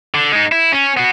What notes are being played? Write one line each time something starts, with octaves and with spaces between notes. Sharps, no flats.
D3
G#3 D#4
E4
C#4
B3 F#4